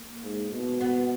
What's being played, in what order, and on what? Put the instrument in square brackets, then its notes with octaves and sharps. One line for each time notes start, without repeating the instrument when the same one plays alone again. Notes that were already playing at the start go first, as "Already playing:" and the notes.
Already playing: [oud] A#3
[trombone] G#2
B2
[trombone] B2 [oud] B3